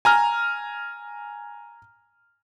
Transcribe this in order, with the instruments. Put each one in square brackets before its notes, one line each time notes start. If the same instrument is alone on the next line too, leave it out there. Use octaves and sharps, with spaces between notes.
[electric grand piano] G#5 A#5 F6